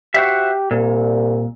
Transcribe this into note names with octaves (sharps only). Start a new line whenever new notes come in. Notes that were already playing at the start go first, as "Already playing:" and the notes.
F#4 G4 C5 E5
C2 A#2